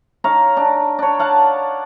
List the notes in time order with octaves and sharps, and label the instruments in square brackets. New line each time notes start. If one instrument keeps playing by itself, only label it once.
[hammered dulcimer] D#4 C#5 F5 A#5
D4
D4 C#5
F5 F#5 A5